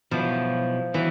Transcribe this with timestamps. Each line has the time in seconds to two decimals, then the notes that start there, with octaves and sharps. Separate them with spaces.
0.11 B2 F3 F#3 B3 E4
0.94 E3 F#3 B3 E4